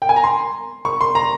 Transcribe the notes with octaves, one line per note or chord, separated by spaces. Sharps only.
G5
G#5
A#5
C6
C#6
C6
A#5